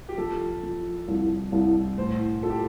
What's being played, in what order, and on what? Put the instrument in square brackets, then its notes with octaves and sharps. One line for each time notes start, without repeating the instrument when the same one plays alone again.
[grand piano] G4
[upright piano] F3 [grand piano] A4
[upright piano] F3
C2
C2
[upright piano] A2 [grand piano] C5
[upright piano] F4 [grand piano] A4
[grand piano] G4